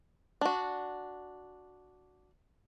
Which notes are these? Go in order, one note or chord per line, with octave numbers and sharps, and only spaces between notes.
D4 F#4